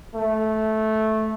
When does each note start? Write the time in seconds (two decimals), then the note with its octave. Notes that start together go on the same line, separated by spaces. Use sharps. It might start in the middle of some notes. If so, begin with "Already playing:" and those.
0.15 A3